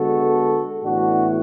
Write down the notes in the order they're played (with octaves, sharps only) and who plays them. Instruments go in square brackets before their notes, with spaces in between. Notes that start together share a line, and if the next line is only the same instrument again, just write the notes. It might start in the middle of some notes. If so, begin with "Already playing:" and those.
Already playing: [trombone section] D3 G#3 B3 F#4 A4
A2 E3 B3 D4 F#4